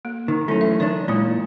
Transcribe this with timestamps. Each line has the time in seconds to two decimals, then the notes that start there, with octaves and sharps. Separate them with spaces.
0.05 A#3
0.28 D#3
0.48 F#3 A3 C#4 E4
0.61 E3 E5
0.80 D#3 D4 C#5
1.08 A#2 G#3 D4 E4